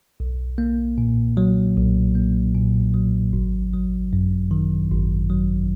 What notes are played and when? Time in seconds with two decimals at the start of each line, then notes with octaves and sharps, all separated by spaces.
0.20 B1
0.58 A#3
0.98 A#2
1.37 F#3
1.77 B1
2.15 A#3
2.55 A#2
2.94 F#3
3.33 G#1
3.73 F#3
4.13 F#2
4.51 D#3
4.91 G#1
5.30 F#3